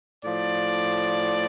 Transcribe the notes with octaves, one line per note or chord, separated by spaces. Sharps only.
A2 F3 D5